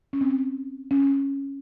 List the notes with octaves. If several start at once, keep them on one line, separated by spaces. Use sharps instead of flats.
C#4
C4
C#4